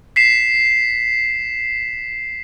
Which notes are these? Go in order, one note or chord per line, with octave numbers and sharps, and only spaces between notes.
B6 C7 E7